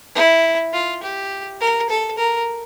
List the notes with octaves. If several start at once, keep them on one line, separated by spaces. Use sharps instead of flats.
E4
F4
G4
A#4
A4
A#4